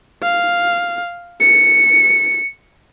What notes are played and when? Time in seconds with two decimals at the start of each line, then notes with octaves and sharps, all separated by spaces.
0.23 F5
1.41 C#7